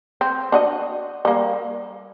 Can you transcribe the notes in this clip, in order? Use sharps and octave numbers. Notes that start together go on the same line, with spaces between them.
C4
D4 F#4 D#5
G3 A#3